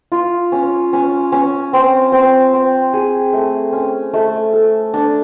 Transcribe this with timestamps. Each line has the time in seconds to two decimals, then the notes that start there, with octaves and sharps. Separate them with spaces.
0.12 F4
0.52 C#4
0.93 C#4
1.32 C#4
1.73 C4
2.12 C4
2.53 C4
2.93 G#4
3.33 A3
3.73 C#4
4.14 A3
4.53 A4
4.94 D4